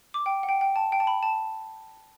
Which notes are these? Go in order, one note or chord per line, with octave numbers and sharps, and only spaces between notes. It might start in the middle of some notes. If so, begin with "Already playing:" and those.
D6
G5
F#5
G5
G5
A5
G5
A5
B5
A5